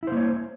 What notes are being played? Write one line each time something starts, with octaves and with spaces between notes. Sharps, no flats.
A#3 E4 C5 C#5